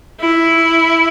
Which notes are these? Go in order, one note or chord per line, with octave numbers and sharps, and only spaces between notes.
E4